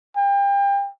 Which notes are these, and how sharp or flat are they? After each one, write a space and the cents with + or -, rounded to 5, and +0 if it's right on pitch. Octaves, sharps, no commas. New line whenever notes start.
G5 +30